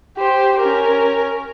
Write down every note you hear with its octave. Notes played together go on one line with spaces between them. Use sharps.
G4 C5
C#4 A#4